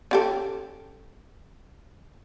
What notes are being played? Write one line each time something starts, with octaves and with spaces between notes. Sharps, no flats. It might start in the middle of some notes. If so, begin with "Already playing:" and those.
C#4 G4 A4